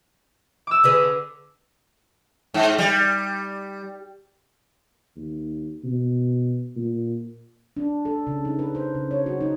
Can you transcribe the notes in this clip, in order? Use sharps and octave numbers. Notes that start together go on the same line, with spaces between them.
D6 E6
D3 G#4 B4
G#2
G3
D#2
B2
A#2
D4
A4
C#3
D#4
B4
C5
C#3
C#5
F#4
D#4